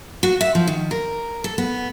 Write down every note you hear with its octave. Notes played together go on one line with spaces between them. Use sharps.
F#4
E5
F3
D#3
A#4
A4
B3